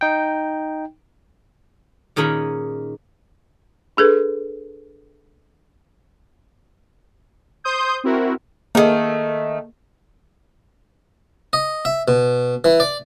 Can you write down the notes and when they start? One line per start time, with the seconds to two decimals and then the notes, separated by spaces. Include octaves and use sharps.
0.01 D#4 G5
2.16 A#2 D#3 C#4 G#4 A#4 B5
3.97 D4 G#4 A4 B4
7.64 C5 C6 D#6 G6
8.04 C4 E4 F#4 A#4
8.75 D#3 A3 A#3 G#4
11.53 D#5
11.85 E5
12.08 B2
12.64 E3
12.80 D5